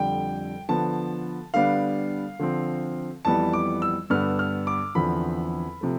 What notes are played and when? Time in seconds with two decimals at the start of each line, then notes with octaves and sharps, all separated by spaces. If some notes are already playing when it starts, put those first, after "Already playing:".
Already playing: F2 D3 G3 G5
0.69 D3 F3 B3 A5
1.54 D3 G3 B3 D4 F5
2.39 D3 F3 C4
3.25 F2 E3 G3 B3 A5
3.53 D6
3.82 E6
4.10 G2 D3 G3 B3 D4 F6
4.39 F6
4.67 D6
4.95 E2 D3 F3 C4 B5
5.81 C3 F3 A3